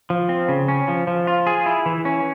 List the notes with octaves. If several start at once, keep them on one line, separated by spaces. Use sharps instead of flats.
F3
C4
C#3
C#4
F3
F3
F4
G#4
E4
E3
C#4